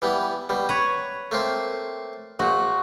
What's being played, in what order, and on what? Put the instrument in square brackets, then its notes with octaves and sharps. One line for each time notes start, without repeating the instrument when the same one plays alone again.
[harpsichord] E3 G3 B3
B2 G3
[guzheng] B4 C#5 [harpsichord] A#5
[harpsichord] A3 A#3 C4
[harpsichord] A#1 A#2 [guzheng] F#4